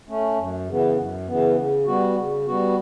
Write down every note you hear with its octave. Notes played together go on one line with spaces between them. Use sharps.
A3 C#4
F#2
C#3 E3 B3
F#2
C#3 E3 B3
C#3
G3 B3 F#4
C#3
G3 B3 F#4